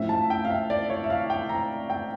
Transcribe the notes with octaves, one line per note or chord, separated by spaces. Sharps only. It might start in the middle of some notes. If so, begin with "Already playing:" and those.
Already playing: A2 F3 A3 C#4 E5
A5
G5
F5
E5
D5
C#5
E5
F5
G5
A#5
G5